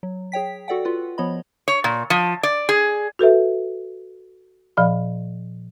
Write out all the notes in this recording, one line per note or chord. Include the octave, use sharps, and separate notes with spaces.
F#3
G#4 C#5 G5 B6
F#4 A4 D5 F#5 G5
F4 B4
F3 B3 C#5 D#5 B5
C#5
A#2
F3
D5
G#4
F#4 A4 B4 E5
A#2 F3 D5 F5 B5